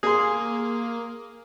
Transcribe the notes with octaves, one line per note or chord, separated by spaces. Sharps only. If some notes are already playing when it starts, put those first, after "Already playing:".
A#3 G#4 C6